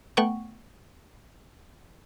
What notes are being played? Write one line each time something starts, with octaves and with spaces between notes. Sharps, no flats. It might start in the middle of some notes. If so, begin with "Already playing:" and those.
A3 B3 F#5 G5 C#6